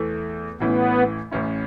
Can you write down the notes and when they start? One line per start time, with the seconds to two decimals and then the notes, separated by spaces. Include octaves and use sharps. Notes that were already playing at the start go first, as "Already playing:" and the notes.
Already playing: E2 E3 A3
0.60 A1 A2 E3 B3 C#4 E4
1.31 A1 A2 E3 C#4 E4